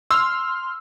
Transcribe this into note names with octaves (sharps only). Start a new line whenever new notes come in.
C6 E6 F6